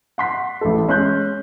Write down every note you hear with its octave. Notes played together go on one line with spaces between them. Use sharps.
F#5 C6 B6
A1 A4
G#3 C#4 C6 F#6 G6